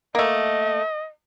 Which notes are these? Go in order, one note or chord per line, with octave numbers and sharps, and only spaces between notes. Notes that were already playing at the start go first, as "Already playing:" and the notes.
A3 A#3 D#5